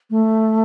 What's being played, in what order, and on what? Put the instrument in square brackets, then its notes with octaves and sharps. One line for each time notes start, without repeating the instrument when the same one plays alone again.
[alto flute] A3